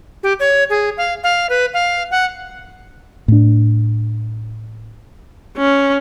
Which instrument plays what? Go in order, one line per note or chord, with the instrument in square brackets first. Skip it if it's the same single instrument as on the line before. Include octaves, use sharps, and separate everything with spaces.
[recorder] G4
C#5
G#4
F5
F5
B4
F5
F#5
[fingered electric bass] A2 D4
[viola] C#4